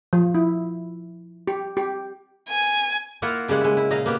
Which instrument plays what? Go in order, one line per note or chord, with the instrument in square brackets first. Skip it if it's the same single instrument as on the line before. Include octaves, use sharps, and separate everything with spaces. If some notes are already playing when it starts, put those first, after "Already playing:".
[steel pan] F3
E4
G4
G4
[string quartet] G#5
[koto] A#3 E4 F4 A#4 F#5
C#3 G3 G#3 F#5
G#3 E4
E4
A#2 D#5 F5 A#5
A#3 B3 G4